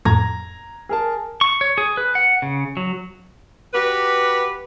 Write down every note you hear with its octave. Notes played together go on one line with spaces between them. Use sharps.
F2 A2 A#5 G#6 A#6
G#4 A#4 A5
C#6
C#5
G#4
B4
F#5
C#3
F#3
F#4 G4 B4